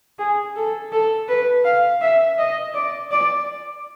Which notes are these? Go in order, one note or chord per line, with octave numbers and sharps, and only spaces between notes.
G#4
A4
A4
B4
F5
E5
D#5
D5
D5